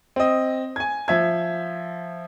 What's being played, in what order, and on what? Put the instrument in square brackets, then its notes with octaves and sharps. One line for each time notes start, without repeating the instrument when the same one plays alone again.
[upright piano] C4 D#5
G#5 G#6
F3 E5 G#6